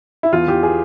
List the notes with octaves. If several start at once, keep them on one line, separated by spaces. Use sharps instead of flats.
E4
E2 F4
E2 G4
G#4